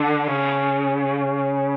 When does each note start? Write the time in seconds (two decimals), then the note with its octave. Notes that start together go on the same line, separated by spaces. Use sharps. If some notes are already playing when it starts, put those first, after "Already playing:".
Already playing: D3
0.27 C#3